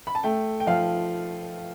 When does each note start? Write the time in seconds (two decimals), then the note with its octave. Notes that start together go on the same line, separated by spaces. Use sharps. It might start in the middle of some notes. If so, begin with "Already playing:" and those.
0.07 B5
0.15 A5
0.23 A3 G5
0.60 G5
0.67 F3 F5